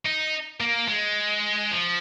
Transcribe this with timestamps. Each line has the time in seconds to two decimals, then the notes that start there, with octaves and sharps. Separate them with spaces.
0.05 D#4
0.61 A#3
0.88 G#3
1.71 F3